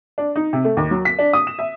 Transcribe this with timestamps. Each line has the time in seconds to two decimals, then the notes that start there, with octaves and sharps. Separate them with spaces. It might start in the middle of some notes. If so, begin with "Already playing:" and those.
0.18 D4
0.36 D#4
0.53 C3
0.65 A3
0.77 D#2
0.91 F#3
1.05 B6
1.19 D4
1.33 D#6
1.47 E7
1.59 E5